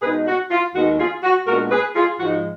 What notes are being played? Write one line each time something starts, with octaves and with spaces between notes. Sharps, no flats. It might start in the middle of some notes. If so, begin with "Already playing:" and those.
B2 G#3 D#4 G#4 B4
F#4
F4
D#2 D#3 G#3 B3 F#4
F4 G#4
F#4
A#2 G#3 B3 D4 F#4 A#4
G#4 B4
F4 G#4
G#2 F3 G#3 D#4 F#4